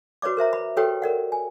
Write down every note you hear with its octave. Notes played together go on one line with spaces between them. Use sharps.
F#4 B4 C#5 D5 D6
A#4 C5 E5 A#5
B5
F#4 G4 A4 B4 C#5 G5
A#4 D5 F#5
G#5